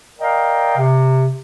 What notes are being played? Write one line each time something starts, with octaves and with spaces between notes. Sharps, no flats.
A#4 D5 D#5 F5 G5
C3